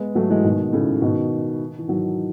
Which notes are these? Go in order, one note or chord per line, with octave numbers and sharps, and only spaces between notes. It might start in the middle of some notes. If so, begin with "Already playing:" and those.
Already playing: G#3 B3
F#3 A3
E3 G#3
B2 D#3
A2 C#3
B2 D#3
E3
D#3 F#3